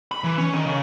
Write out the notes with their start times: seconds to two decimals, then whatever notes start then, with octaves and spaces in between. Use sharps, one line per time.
0.12 B5
0.24 E3
0.38 C#4
0.53 D#3
0.66 C#3